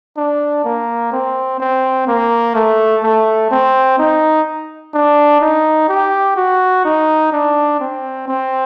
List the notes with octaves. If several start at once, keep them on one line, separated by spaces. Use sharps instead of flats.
D4
A#3
C4
C4
A#3
A3
A3
C4
D#4
D4
D#4
G4
F#4
D#4
D4
C4
C4